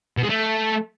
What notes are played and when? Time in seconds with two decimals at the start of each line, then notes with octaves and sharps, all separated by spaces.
0.17 B2
0.24 G#3
0.30 A3